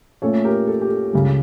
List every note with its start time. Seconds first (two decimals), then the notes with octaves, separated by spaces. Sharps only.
0.22 A#2 A3 C#4 A4 C#5
0.44 G4 A#4
0.67 A4
0.81 G4
0.90 A4
1.13 C#2 C#3 G3